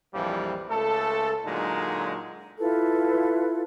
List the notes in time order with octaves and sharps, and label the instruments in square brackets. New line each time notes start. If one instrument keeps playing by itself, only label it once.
[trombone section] A#1 F2 E3 F3 G3
C#2 A3 A4
A#2 D3 F#3 G#3 D#4
[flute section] E4 F4 A4 B4